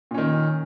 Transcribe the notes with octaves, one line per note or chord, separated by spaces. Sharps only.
A#2 D#3 C#4